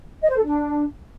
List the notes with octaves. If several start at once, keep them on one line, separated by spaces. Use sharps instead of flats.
D#5
C5
A4
D4